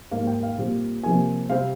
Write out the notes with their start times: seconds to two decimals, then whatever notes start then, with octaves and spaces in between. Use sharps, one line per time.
0.11 G#2 G3 A#3 F5
0.27 G5
0.43 F5
0.58 A#2 G3 C4
1.04 C3 F3 A#3 G#5
1.50 C3 G3 C4 F5